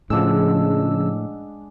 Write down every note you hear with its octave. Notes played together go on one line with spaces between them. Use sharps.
A2 C#3 F3 G#3 D4 F#5 E6